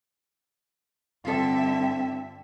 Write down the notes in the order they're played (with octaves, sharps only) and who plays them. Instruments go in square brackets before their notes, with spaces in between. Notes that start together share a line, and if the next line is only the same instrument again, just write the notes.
[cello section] G2 D3 E5 [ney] C4 [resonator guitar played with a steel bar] F4 A4